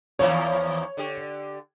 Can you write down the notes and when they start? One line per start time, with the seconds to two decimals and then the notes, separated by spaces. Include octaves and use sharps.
0.19 D#2 E3 F3 C#5
0.97 D3 G4